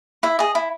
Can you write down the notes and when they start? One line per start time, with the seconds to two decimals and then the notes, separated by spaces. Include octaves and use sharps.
0.23 E4 E5
0.39 G#4 D#5
0.55 E4